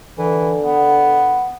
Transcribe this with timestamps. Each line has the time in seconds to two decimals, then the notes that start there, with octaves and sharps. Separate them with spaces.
0.19 D3 E3
0.61 B3